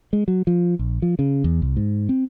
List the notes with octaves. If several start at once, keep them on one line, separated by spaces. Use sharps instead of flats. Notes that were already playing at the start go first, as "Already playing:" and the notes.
G#3
F#3
F3
A#1
F3
C#3
E2
C2
G#2
C4